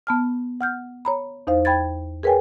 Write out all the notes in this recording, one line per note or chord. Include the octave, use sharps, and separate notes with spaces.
B3 A5 F6
F#5 F6 G6
C#5 A#5 B5
E2 D#4 C5 F5
G5 B5 G#6 A6
G#4 A#4 B4 C#5 G5 G#5